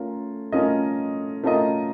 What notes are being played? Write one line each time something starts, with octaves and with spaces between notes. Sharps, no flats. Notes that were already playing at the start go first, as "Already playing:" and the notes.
Already playing: A3 C#4 F4 A#4
A3 C#4 F4 A#4 D#5
A3 C#4 F4 A#4 D#5